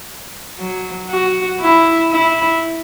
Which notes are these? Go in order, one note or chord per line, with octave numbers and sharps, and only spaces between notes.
F#3
F#4
E4
E4